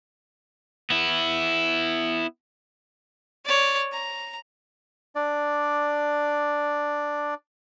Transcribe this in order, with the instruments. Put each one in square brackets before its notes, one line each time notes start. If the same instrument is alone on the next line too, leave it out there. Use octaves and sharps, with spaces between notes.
[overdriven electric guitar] B3 E4
[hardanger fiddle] C#5 D5
A#5
[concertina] D4 D5